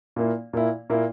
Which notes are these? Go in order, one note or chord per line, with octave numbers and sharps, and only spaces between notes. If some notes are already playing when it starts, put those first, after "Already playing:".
A#2 A#3 E4
A#2 A#3 E4
A#2 A#3 E4